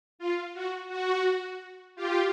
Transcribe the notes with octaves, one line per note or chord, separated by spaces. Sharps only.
F4
F#4
F#4
F4 G4